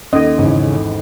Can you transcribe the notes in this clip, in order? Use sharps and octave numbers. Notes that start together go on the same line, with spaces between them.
D#2 C#4 A4 D#5
G#1 E2 C#3